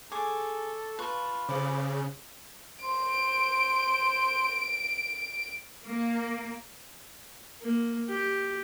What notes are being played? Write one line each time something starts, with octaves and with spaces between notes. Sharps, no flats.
G#4 A4 C#6 D6
F4 B4 A5 C#6
C#3 C5 D6
C5 D7
A#3
A#3
G4